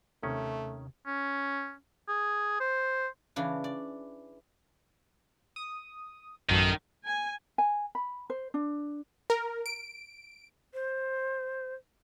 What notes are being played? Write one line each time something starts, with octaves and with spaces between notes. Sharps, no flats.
D#2 C3 D#3 A3 C#4
C#4
G#4
C5
C#3 E3 D4
D5
D#6
A1 F#2 D#3 A4
G#5
G#5
B5
C5
D4
A#4
D7
C5